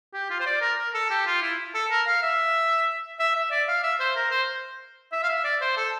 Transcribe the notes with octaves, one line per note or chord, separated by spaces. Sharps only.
G4
F4
C5
D5
A#4
A#4
A4
G4
F4
E4
A4
A#4
F5
E5
E5
E5
D5
F5
E5
C5
A#4
C5
E5
F5
E5
D5
C5
A4